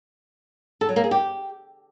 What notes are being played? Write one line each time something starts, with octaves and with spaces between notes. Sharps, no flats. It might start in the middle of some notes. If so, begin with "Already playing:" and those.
A4
F#3
A#3
G#4
G4